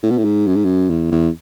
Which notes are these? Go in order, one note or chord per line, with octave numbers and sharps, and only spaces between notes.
A2
B2
A2
G#2
F#2
G#2
F#2
E2
E2